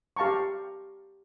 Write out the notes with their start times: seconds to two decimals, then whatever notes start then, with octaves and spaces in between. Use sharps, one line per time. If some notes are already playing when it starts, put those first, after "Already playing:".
0.17 G4 F5 A5 A#5 C#6